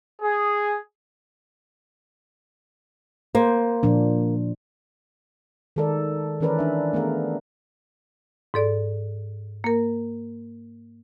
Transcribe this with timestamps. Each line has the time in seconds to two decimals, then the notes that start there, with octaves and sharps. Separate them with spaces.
0.22 G#4
3.35 A#3 C5
3.83 A#2 F3 D4
5.76 D#3 G#3 A4 A#4 D5
6.40 D#3 E3 C#4 A#4 B4 D5
6.59 D4 E5
6.93 A3 B3 G#4 A#4 F5
8.54 G#2 A4 D5
9.64 A#3 A#4